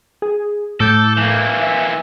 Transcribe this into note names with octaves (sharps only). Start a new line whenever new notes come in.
G#4
A2 A4 D6 G6
E3 A#3
E5